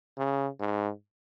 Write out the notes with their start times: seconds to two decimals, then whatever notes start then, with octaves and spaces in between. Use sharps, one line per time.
0.18 C#3
0.60 G#2